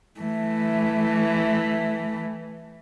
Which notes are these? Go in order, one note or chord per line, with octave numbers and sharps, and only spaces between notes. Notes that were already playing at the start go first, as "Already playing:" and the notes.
E3 A3